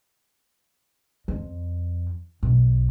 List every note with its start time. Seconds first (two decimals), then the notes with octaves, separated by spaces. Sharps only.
1.28 F2
2.43 B1